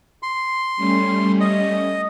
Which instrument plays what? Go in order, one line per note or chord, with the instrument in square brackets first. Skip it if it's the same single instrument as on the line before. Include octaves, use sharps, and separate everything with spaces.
[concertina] C6
[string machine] G3 A3 C#4
[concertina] D#5